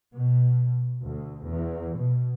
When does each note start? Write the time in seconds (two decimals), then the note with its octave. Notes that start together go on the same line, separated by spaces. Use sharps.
0.14 B2
1.03 D2
1.49 E2
1.98 B2